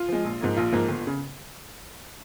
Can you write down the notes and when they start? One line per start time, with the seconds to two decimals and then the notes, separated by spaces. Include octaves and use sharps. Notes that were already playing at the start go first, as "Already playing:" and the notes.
Already playing: F4
0.08 F3 G#3
0.24 A#1
0.41 G#2 F3 A#3
0.57 A#1 F4
0.73 G#2 F3 A#3
0.89 G1
1.07 C#3